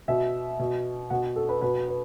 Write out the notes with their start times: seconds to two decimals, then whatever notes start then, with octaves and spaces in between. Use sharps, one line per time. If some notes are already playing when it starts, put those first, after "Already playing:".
0.08 B2 E5
0.60 B2
1.10 B2 F#5
1.36 A4
1.49 B4
1.61 B2 B4
1.88 B4